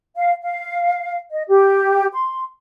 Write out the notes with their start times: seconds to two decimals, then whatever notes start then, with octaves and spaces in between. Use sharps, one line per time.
0.15 F5
0.42 F5
1.30 D#5
1.49 G4
2.14 C6